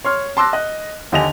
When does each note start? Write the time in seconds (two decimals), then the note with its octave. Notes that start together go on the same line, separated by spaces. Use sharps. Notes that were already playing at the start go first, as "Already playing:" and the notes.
0.05 C#5 C6 F6
0.37 A5 C6 D6 E6 F#6 A#6
0.53 D#5 F#6
1.12 D#2 D3 G4 D#5 G#5 F7